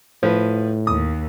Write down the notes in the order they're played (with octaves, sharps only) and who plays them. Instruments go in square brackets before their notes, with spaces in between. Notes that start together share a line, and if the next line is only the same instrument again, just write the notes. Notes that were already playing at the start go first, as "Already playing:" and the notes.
[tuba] A2 [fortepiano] F3 B4
[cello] D#2 [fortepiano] D#6